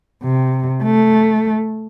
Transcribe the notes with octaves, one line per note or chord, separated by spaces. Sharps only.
C3
A3